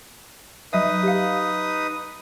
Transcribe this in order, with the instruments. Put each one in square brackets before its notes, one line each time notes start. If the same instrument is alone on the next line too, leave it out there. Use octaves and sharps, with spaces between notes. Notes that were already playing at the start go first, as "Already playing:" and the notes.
[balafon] F#3 D#5 E5 [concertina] D#4 B4 D#6
[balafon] G4 F5